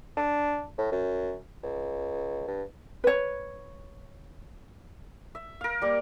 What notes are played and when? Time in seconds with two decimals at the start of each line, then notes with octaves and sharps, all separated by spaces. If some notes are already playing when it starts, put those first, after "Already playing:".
0.17 D4
0.78 A2
0.91 F#2
1.63 C#2
2.47 G2
3.04 B4 C#5
5.35 E5
5.61 A#4 F5
5.82 G3 A#3